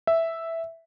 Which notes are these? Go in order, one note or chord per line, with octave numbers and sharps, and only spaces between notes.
E5